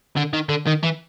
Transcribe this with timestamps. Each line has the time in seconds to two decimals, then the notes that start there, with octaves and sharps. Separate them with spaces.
0.16 D3
0.33 D#3
0.49 D3
0.67 D#3
0.83 E3